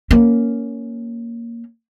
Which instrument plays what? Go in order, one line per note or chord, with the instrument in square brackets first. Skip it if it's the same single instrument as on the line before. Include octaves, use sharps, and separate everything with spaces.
[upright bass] A#3 C#4